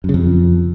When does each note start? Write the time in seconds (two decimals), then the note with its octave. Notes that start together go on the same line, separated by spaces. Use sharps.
0.04 F#2
0.09 C#3
0.14 F2